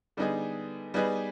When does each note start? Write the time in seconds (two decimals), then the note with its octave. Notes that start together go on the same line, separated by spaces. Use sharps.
0.17 D3 G3 B3 D#4 G#4
0.94 G3 B3 D#4 G#4 B4